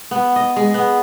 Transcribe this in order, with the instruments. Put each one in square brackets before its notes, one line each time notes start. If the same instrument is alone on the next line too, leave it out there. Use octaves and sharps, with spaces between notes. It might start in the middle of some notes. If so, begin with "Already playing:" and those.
[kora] B3
D#5
G#3
B3